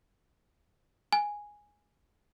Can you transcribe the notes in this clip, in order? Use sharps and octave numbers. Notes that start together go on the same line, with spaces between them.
G#5